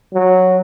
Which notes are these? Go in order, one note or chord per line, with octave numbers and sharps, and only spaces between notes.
F#3